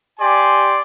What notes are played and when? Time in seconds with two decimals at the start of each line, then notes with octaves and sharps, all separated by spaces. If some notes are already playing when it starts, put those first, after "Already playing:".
0.19 G4 D5 G#5 C6